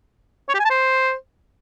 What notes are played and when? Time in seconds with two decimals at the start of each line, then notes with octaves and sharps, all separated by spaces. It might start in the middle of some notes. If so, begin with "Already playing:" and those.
0.49 C#5
0.54 G4
0.60 G#5
0.65 A5
0.70 C5